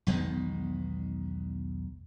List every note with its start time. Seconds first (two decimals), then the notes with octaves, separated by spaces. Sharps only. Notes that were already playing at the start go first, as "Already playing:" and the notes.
0.07 B1 E2 D#3 G#3